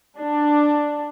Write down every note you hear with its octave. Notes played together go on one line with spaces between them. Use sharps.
D4